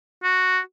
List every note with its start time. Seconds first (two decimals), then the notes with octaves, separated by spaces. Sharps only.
0.23 F#4